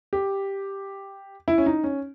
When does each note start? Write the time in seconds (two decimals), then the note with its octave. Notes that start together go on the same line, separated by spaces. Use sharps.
0.13 G4
1.48 E4
1.58 C#4
1.66 D#4
1.84 C#4